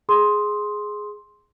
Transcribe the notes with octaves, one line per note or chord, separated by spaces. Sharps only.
G#4 C6 D#6